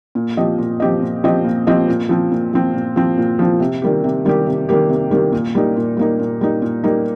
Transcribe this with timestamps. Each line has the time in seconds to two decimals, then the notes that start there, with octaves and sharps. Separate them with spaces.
0.15 A#2
0.37 F3 C4 G4 D#5
0.59 A#2
0.80 F3 C4 G4 D#5
1.02 A#2
1.24 F3 C4 G4 D#5
1.45 A#2
1.67 F3 C4 G4 D#5
1.88 A#2
2.09 F3 C4
2.32 A#2
2.53 F3 C4
2.74 A#2
2.96 F3 C4
3.18 A#2
3.39 F3 C4
3.60 C3
3.82 D#3 G3 A#3 G4
4.04 C3
4.25 D#3 G3 A#3 G4
4.47 C3
4.69 D#3 G3 A#3 G4
4.89 C3
5.11 D#3 G3 A#3 G4
5.32 A#2
5.55 G3 A#3 D#4
5.76 A#2
5.97 G3 A#3 D#4
6.20 A#2
6.41 G3 A#3 D#4
6.62 A#2
6.84 G3 A#3 D#4